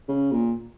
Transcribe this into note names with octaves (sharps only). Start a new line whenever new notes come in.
C#3
A#2